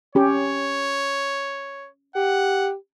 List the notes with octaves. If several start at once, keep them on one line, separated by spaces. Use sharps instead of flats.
C#4 G4 C#5
G4 F#5